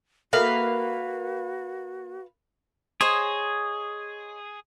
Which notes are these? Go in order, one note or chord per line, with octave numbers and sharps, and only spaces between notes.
A#3 F#4 A4 B4 E5 F5
G#4 C5 C#5 D#5